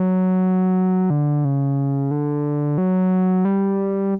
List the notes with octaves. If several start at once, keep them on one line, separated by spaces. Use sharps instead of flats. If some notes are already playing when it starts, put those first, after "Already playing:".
Already playing: F#3
D3
C#3
D3
F#3
G3